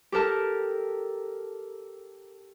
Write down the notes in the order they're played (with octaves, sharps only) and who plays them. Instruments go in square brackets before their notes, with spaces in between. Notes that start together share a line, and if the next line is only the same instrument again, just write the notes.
[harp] G4 A4 A#4 A5